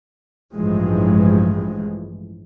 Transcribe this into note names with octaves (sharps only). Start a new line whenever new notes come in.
A1 G2 E3 F3 G#3